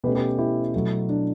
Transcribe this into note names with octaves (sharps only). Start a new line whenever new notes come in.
B2 A3 C#4 G4 B4
G4 B4
E4 G4
B2 F#3 A3 E4
D4